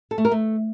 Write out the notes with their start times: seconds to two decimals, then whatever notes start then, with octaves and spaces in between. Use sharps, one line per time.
0.11 A4
0.18 A3
0.25 A#4
0.31 A3